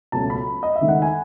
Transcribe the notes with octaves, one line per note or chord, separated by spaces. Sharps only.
C#2 B2 F#3 A3 C#4 A5
B5
D#5
E5
G#1 G#2 D#3 A3
F#5
G#5